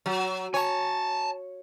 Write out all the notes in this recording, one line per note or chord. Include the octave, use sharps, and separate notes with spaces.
F#3
C#5 G#5 A5